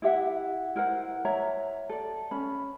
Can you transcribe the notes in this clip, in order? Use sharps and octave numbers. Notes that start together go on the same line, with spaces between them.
E4 G4 E5 F#5
E4 A#4 C5 F#5
C#5 E5 A#5
A4 D5
C#4 B5